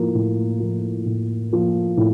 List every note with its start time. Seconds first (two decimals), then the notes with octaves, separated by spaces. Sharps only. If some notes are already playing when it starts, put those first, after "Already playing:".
Already playing: A2 F3 A#3
0.15 A2
0.60 F3 A#3
1.06 A2
1.51 F3 A#3
1.97 A2